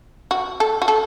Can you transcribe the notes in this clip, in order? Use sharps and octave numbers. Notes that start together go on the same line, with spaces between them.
F#4
A4
F#4
A4